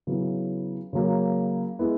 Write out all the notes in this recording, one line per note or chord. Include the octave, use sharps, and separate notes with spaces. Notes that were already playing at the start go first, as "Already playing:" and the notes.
C#3 F#3 B3 E4
C#3 F#3 A#3
G#3 B3 E4